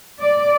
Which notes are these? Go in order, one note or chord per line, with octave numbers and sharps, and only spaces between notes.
D5